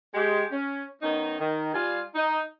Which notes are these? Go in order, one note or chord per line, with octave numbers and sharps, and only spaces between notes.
G#3 G4
C#4
D#3 B3 C#4 D#4
D#3
G3 F4 G#5
D#4